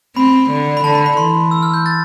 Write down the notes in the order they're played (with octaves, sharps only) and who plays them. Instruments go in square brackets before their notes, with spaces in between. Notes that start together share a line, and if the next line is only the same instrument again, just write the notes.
[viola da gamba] C4 [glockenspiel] B5
[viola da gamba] D3
[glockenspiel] B5
[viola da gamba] D3 [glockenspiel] A5
[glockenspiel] B5
B5
[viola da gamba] E3 [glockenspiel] C6
[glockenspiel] E6
F6
G6
A6